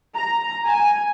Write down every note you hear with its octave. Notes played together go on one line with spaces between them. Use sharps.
A#5
G#5